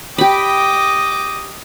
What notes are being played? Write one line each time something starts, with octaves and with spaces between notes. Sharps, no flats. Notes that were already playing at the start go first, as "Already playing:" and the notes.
G4 D#5 G5 B5 D6